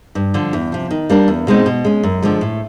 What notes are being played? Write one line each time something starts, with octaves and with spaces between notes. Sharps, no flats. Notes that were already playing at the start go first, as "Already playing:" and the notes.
G2
D3 F3
E2
C3 F3
D#3
G3 A#3 D4
E2
B2 G#3 C4 D#4
B2
G#3 C#4
F#2
D3 F3 G#3
A2